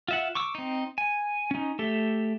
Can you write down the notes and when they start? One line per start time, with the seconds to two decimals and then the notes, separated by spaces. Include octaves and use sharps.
0.08 F4 E5 F#5
0.35 C#6 D6 E6
0.55 C4 D#4
0.98 G#5
1.51 C#4 D#4
1.79 A3 G4 A4 E5